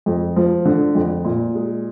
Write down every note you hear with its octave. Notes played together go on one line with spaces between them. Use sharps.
F2
F3
D3
F2
A#2
G#3